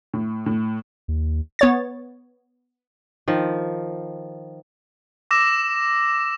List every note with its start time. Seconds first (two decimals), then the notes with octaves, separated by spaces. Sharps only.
0.14 A2
0.46 A2
1.08 D#2
1.59 B3 C#5 A6
3.28 D#3 F3
5.31 D6 E6 A#6 E7